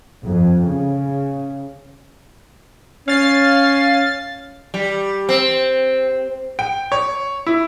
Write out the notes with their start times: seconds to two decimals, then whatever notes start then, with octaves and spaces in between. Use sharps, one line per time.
0.23 F2
0.67 C#3
3.08 C#4 F5 A6 C7
4.74 G3
5.29 C4
6.59 G5
6.92 C#5
7.47 E4